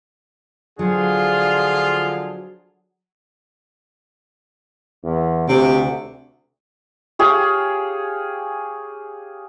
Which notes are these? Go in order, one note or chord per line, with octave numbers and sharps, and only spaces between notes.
D3 F3 F#3 D4 F4 G#4
E2
D2 C3
G4 G#4 C#5 F5